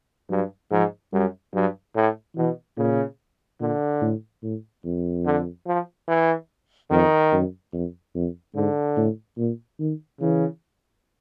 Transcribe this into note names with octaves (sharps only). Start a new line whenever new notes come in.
G2 F#3
G#2 F3
F#2 G3
G2 F#3
A2
B2 E3
A#2 C#3
A#2 D3
A2
A2
F2
D3
F3
E3
F2 D#3
F#2
F2
F2
G#2 D3
A2
A#2
D#3
C#3 E3